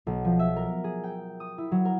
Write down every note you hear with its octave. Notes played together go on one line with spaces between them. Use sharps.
B1
F3
E5
A#4
G#4
G5
D#6
E4
F#3
A#4